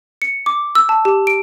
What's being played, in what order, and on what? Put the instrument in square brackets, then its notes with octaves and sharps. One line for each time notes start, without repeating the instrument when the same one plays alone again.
[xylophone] C#7
D6
E6
A5
G4
D7